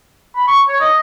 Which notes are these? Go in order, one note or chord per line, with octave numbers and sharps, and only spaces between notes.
B5
C#6
C#5
D#5